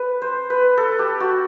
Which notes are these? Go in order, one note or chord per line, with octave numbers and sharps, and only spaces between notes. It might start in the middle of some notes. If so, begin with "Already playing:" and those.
Already playing: B4
C5
B4
A4
G4
F#4